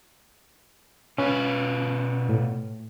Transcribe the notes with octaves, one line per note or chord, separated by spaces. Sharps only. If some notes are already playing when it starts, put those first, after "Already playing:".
B2 C#4 F4 B4
A2